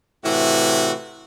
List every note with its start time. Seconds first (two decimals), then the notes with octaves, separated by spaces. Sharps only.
0.23 A2 C3 E3 F#4